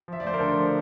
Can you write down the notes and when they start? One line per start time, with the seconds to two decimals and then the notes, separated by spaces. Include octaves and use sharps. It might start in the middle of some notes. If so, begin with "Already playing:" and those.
0.08 F3 E5
0.20 D5
0.25 D2 C5
0.34 A#4
0.40 D3 A4
0.57 F3